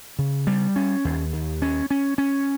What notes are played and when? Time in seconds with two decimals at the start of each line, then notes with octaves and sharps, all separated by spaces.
0.19 C#3
0.47 G3
0.76 C#4
1.05 D#2
1.33 D#2
1.62 C#4
1.90 C#4
2.18 C#4